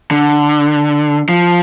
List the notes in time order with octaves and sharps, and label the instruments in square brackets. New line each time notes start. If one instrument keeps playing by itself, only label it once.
[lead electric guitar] D3
F3